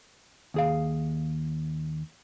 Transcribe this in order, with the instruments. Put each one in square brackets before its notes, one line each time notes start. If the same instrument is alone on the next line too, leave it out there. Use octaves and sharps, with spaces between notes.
[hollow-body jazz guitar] D#2 G#4 F5